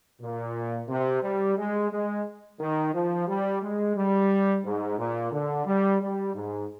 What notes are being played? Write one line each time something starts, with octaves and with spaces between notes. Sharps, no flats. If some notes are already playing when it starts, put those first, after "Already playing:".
A#2
C3
G3
G#3
G#3
D#3
F3
G3
G#3
G3
G#2
A#2
D3
G3
G3
G#2